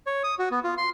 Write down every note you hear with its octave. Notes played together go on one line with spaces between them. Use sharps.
C#5
D#6
F#4
B3
F4
C6